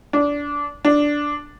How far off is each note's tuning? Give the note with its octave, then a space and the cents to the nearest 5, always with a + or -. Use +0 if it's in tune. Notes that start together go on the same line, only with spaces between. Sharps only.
D4 -20
D4 -5